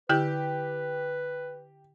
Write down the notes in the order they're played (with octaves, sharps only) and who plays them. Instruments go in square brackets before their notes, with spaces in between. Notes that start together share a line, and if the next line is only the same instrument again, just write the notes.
[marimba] D3 E4 G6 [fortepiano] G4 [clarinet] B4